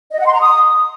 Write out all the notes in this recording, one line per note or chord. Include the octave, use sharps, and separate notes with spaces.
D#5
F#5
C6
A#5
D#6